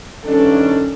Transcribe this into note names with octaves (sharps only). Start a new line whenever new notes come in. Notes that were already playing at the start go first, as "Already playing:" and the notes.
G2 D#3 C#4 D4 A4